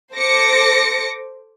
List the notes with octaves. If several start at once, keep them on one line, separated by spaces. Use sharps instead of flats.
A4 C5 D6 A#6 C#7